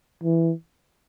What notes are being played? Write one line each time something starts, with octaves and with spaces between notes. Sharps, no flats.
E3